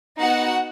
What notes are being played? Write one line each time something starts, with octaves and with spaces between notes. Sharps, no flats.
B3 D#4 F#4 F#5